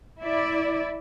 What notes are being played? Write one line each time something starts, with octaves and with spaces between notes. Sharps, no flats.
E4 D5